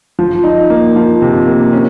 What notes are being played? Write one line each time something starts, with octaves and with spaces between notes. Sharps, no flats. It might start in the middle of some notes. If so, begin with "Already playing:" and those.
F3
D#4
A#3
F3
C3
A#3
C#4